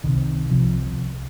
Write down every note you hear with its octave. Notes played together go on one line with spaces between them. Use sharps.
C2 C3 D#3
C2 C3 F3